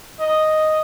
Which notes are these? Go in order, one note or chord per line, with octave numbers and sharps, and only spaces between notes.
D#5